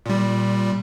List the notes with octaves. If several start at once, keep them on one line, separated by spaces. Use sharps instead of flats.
A#2 G3